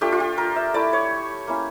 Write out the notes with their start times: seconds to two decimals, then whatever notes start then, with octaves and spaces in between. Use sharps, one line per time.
0.01 A3 D4 F4 G4
0.12 F4
0.20 G4
0.38 A#4
0.56 E5
0.74 A3 E4 D5
0.93 C#5
1.47 A#3 C#4 E4